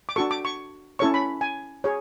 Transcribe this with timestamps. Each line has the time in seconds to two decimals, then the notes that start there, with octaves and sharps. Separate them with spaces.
0.09 D6
0.16 D4 F#4 A4 C#6
0.31 D6
0.45 C#6
0.99 C#4 E4 A4 C#5 C#6
1.14 B5
1.41 G#5
1.84 G#4 C#5